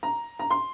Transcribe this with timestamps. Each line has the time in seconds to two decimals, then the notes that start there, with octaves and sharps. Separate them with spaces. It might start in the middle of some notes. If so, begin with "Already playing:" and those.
0.03 A#5
0.39 A#5
0.50 C6